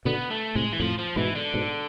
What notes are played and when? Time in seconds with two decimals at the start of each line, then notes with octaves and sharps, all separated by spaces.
0.05 B2 D3 B3
0.30 A3
0.55 A2 C3 G#3
0.73 E3
0.80 F2 A2 F3
0.98 F3
1.16 G#2 B2 E3
1.35 D3
1.54 G#2 B2